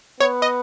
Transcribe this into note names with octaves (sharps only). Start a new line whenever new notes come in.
B3 C#5
D#5